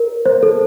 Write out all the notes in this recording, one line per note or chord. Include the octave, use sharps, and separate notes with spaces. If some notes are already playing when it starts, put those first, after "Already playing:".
Already playing: A#4
C5
A4